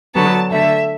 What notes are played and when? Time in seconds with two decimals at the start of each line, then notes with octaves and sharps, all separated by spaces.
0.14 D3 F#3 B3 A5
0.52 D3 A3 E5